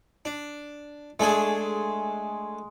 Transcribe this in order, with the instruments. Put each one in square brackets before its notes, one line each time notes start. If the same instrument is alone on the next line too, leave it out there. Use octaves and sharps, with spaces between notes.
[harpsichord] D4
[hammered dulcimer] G#3 [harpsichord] A3 D4 G#4